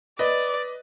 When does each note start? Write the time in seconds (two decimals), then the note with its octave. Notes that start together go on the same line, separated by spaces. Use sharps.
0.19 B4 D5 D#5